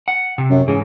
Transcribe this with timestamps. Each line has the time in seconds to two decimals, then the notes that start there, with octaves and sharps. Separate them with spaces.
0.08 F#5
0.38 C3
0.50 F#2
0.68 G#2 C#3 E3